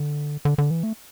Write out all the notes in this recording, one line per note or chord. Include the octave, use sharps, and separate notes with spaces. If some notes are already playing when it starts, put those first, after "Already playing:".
Already playing: D3
D3
D3
E3
A3